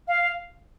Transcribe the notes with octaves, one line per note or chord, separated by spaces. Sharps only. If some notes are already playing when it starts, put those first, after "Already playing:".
F5